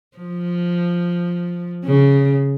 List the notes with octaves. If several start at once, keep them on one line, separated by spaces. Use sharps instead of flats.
F3
C#3